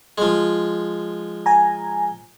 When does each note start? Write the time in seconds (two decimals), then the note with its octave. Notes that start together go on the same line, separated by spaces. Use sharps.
0.18 F3 G#3
1.46 G#5 A#5